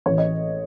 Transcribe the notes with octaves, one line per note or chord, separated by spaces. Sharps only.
A1 A2 E3 C#5
D#5